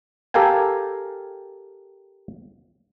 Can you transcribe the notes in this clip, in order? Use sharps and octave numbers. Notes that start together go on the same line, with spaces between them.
G4 A4 A#4 F5 G5 G#5